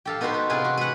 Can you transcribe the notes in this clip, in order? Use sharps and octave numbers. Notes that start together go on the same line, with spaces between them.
G4 A4 F5
B3 D#4 F#4 B4 C5
B4
C3 F4 G#4 B4
F#4
B4 F#5